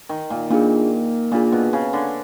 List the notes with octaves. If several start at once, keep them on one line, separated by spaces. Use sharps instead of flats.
D#3
A#2
A#2 A#3 D4 F4 G#4
A#2 A#3 D4 F4 G#4
B2
C#3
D3